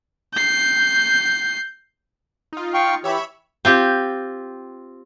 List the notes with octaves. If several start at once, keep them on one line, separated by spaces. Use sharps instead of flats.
G6 C7
D#4 F4
F5 G5 C#6
E3 G4 C#5 E5 B5
C4 F4 G4